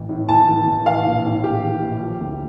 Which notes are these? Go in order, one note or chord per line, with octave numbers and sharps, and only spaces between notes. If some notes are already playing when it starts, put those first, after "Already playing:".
Already playing: A1 E3
A2
A1 A5
E3
A1
E3 F5
A#1
A2
A#1 G4
E3
A#1
F3
D2